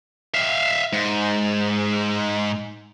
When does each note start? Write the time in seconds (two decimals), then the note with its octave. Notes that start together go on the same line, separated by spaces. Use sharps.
0.34 E5 F5
0.93 G#2